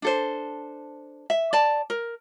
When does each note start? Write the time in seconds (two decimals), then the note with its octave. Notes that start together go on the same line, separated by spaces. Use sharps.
0.02 D4 A4 C5
1.30 E5
1.53 D5 A5
1.90 A#4